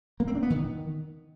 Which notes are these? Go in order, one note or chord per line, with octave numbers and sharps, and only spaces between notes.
A#3
C4
D4
B3
D#3